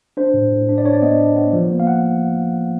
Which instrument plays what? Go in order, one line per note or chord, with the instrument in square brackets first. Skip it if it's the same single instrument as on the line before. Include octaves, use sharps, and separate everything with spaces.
[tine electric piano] D4 C5
A2
A2
D4
D5
D4 C#5
D5
B3 D#5
D4
B3
F3
A#3
F5
F#5